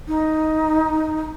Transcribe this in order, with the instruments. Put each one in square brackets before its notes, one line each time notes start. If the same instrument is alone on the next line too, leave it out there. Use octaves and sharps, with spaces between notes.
[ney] D#4